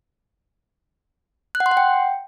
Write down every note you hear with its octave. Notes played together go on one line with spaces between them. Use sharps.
F#6
F#5
C6
F#5
G5